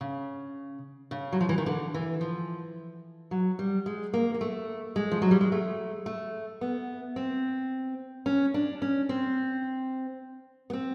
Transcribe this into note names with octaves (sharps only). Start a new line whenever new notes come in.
C#3
C#3
F#3
F3
E3
D#3
D3
E3
F3
F#3
G3
G#3
A#3
A#3
A3
G#3
F3
F#3
G3
G#3
A3
A3
B3
C4
C#4
D4
C#4
C4
B3
C4